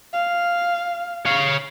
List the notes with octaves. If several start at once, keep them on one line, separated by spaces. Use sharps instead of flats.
F5
C#5 F5